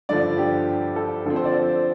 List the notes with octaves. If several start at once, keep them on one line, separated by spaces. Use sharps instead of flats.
G2 D3 F3 D5
G4
A4
D3 F3 C4 A4
C5
D5